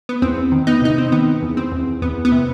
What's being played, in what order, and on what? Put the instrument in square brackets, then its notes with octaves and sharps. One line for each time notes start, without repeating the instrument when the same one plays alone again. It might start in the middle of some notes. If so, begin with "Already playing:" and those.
[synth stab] B3
E2 C4
D#3
B3 D#4
C3 D#4
C4
D#3 B3
E2
C4
E2
E2 B3
B3
C3